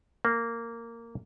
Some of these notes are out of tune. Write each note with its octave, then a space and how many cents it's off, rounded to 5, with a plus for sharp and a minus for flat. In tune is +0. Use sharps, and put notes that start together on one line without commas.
A#3 -15